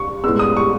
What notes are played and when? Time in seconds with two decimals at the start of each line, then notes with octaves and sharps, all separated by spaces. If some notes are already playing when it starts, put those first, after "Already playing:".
Already playing: C#6
0.24 A2 G#3 B3 E6
0.39 D#6
0.57 C#6